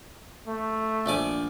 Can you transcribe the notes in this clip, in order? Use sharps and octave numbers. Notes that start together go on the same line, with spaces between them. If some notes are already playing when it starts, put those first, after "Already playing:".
A3
A#1 D5 G#5